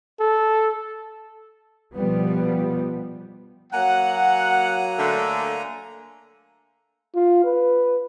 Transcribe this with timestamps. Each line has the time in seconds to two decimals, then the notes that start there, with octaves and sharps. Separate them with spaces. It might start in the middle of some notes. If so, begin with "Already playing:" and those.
0.20 A4
1.95 B2 F3 G3 B3
3.73 F#3 A#3 F#5 G#5 A#5 F#6
4.98 D3 A3
7.15 F4
7.44 B4